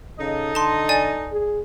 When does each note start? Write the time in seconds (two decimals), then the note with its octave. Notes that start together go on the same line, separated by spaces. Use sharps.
0.19 C#3 D#4 A4 D#5
0.55 D3 A5 C6
0.89 D5 G#5
1.32 G#4